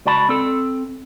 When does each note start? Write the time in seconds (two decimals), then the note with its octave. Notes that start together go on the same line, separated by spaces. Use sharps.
0.06 C#2 F#4 D5 A5 B5
0.29 C4 A4